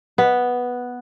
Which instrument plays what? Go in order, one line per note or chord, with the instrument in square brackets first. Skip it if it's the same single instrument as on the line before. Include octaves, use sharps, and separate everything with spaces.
[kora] B3